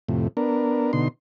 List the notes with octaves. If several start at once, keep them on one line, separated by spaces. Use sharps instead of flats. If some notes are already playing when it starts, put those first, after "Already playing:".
F2 A2 C3
B3 D4 A#4
B2 D3 D#4 C6